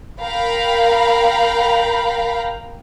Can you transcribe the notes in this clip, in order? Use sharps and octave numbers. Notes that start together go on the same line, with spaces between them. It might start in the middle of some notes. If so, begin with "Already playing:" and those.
A#4 F5 G5 A#5 B5